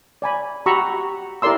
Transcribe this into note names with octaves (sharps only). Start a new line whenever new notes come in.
D5 G#5 B5
F#4 G4 A#5 B5 C#6 E6
E4 G4 A#4 D5 C6 E6